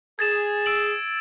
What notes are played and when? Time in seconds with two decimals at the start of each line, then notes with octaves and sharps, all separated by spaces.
0.19 G#4 G#6 A6 E7
0.66 E6 D7 F#7